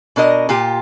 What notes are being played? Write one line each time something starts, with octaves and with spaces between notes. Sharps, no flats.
B2 D4 A#4 D#5
A#2 F4 G4